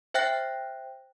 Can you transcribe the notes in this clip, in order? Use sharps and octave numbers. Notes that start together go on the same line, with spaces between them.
C5 E5 G5 F#6 A#6